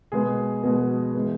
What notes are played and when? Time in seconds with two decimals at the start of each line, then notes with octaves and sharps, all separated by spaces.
0.12 B2 G#3 B3 G#4
0.63 B2 G#3 B3 F#4
1.15 E3 G#3 B3